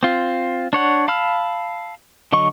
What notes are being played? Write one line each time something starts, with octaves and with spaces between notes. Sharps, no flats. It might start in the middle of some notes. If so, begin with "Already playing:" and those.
C4 F4
D4 C#5 F#5
F5 A5 B5 E6 F6
D3 F#3 D#5 C#6